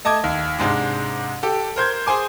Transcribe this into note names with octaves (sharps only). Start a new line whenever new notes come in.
A3 D#5 A5 D6 G#6
D#2
G#2 C3 G#3 D4
G4 A4
A#4 C5 G6 G#6
G#4 C5 G#5 D6